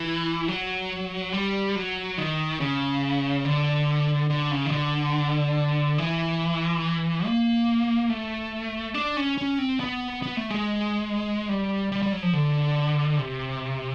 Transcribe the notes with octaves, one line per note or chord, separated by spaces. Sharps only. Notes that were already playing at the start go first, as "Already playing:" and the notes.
Already playing: E3
F#3
G3
F#3
D#3
C#3
D3
D3
C#3
D#3
D3
E3
A#3
A3
D4
C#4
C#4
C4
B3
B3
A3
G#3
G3
G3
G3
F#3
F3
D3
C3